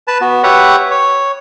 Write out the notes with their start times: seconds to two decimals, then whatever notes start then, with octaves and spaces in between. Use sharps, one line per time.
0.08 B4 A5
0.21 B3 F#4
0.43 G4 B4 C#5 E5 F#5
0.91 C#5